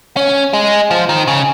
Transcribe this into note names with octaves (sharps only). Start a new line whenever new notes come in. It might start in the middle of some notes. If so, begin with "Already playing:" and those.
C#4
G#3
F3
D#3
C#3